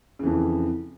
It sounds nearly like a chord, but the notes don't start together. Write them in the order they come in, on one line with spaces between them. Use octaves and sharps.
C#3 E3 F2